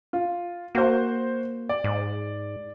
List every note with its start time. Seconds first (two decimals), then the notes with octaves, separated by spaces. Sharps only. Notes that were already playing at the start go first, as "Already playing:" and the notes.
0.13 F4
0.75 A#3 F#4 C5
1.69 D5
1.84 G#2